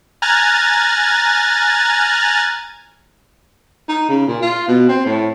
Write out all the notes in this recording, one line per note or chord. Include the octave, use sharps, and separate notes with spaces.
G#5 A#5 F6 F#6 G#6 A6
D#4
C#3
A#2
F4
B2
C4
A2